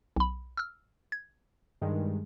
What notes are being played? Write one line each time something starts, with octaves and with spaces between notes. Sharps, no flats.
B1 B5
E6 F6
G#6
G2 D#3 G#3